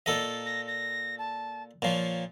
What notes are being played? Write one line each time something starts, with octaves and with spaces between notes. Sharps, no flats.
A#2 A4 D#5
A#6
A#6
A5
A#2 F3 C#5